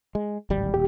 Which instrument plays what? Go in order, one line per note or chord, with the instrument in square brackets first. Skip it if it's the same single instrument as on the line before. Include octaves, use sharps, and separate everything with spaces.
[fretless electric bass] G#3
D1 G#1 G3
[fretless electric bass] D#1 [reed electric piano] G4